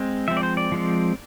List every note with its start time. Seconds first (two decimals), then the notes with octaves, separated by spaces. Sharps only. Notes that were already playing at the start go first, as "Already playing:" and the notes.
Already playing: G#3 C4
0.28 F3 G#3 C4 E5
0.37 D5
0.43 C5
0.57 D5
0.72 F3 G#3 C4